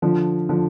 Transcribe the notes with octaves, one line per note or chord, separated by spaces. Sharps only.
D3 F3
D3 F3